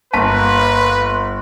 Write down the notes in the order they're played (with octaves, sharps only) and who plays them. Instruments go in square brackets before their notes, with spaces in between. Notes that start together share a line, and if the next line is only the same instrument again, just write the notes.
[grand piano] G1 B6 [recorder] A#3 [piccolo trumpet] B4 [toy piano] A5